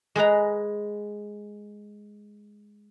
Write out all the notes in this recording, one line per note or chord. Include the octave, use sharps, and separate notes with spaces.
G#3 G#4 B4 A#5